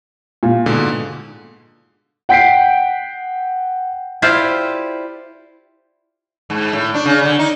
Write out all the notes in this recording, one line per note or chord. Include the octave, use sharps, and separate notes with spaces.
A#2 F5
G#2 B2 D3
F#5 G5 G6 B6 C7 D7
E4 F4 G4 C5 D5
G#2
A2
D4
C#3
D3
D#4